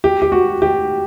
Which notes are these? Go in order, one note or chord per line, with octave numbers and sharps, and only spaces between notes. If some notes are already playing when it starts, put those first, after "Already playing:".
G4
G4
F#4
G4